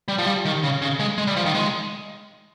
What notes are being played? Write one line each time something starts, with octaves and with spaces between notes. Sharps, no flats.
G3
F3
G3
D#3
C#3
C#3
G#3
G#3
G3
F3
D#3
G#3